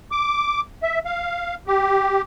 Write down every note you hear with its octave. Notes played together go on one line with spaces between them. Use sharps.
D6
E5
F5
G4